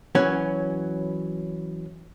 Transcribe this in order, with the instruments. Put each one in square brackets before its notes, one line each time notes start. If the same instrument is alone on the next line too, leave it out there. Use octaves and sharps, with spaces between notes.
[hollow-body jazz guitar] E3 F#3 C#4